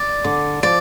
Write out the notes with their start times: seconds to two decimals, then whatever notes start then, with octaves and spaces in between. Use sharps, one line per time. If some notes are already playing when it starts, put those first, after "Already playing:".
Already playing: D5
0.24 D3 D6
0.63 F3 D5